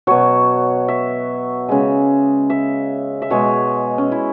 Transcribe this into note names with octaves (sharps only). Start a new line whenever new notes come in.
B2 F#3 C#5
E5
C#3 G#3
E5
E5
B2 G#3 C#5
C#4
E4